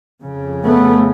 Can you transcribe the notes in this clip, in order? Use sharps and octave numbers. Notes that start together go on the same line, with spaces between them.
F2 C#3
A3 B3